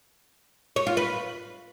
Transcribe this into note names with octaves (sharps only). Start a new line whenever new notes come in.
C#5
F4
B4